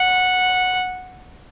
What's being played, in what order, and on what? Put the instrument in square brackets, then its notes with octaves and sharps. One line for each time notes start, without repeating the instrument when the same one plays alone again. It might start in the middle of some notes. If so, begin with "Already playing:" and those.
Already playing: [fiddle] F#5